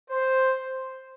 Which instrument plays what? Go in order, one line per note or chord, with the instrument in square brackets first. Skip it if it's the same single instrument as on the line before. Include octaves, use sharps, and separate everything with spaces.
[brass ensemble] C5